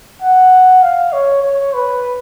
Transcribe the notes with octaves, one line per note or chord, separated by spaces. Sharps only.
F#5
F5
C#5
C#5
B4